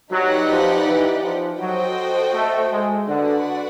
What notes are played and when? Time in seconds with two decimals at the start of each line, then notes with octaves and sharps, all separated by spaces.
0.12 F#3 D#4 G4 B4 D5 F#5
0.49 F3
0.86 E3
1.23 F3
1.60 F#3 F#4 A4 C5 D#5 G5
2.34 A3
2.72 G#3
3.08 D3 F#4 B4 D5 F#5